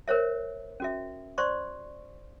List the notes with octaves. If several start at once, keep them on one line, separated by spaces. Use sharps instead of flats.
A#4 C5 C#5 E5
C#4 F#4 E5
C5 D5 C6 C#6